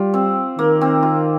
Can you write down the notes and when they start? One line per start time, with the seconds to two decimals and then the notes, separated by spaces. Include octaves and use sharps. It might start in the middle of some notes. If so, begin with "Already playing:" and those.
Already playing: G3 F4 G4
0.14 C4
0.58 D#3 A#3
0.81 C4
1.03 F4